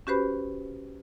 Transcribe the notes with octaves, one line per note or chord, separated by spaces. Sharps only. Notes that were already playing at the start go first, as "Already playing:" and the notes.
C#4 F#4 G4 B4 C5 B5